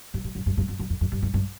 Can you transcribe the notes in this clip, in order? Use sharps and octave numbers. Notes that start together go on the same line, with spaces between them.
G2
G2
F#2
G2
G2
F#2
F#2
F2
F2
G2
G2
G2